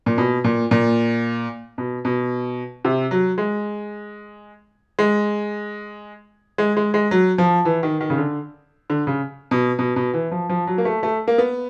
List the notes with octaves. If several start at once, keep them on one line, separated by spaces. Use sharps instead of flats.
A#2
B2
A#2
A#2
B2
B2
C3
F#3
G#3
G#3
G#3
G#3
G#3
F#3
F3
E3
D#3
D#3
C#3
D3
D3
C#3
B2
B2
B2
E3
F3
F3
F#3
A#3
A3
A3
A#3
B3